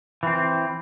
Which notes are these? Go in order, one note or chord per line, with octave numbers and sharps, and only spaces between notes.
E3 C4